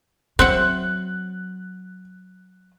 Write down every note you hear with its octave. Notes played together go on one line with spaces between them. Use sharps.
F#3 C4 E5 F#5 F#6